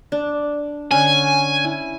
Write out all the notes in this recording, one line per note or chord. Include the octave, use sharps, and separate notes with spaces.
D4
D3 C#4 G#5
E4